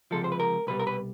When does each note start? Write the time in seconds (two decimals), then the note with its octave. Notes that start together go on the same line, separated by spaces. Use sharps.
0.11 C#2 C3 F3 G#3 A4
0.24 C5
0.32 B4
0.40 A#4
0.67 C2 B2 G3 B4
0.80 A#4
0.87 B4